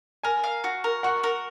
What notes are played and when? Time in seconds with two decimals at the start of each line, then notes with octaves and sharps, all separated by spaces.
0.23 A#4 G#5
0.44 F5
0.64 F#4
0.84 A#4
1.03 F#4 F#5
1.23 A#4